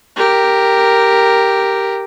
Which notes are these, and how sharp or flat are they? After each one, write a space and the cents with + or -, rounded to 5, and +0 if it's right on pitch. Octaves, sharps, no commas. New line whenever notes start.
G4 +0 A#4 -5